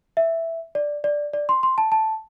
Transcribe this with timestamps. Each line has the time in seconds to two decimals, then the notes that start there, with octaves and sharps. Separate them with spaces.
0.17 E5
0.75 D5
1.04 D5
1.33 D5
1.49 C6
1.63 C6
1.78 A5
1.92 A5